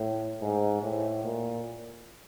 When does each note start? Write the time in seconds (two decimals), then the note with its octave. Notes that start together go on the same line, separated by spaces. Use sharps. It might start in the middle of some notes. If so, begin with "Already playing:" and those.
Already playing: A2
0.41 G#2
0.82 A2
1.24 A#2